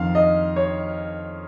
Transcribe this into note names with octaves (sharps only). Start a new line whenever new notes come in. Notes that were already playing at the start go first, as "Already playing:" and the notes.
Already playing: F2 D#3 F5
D#5
C#5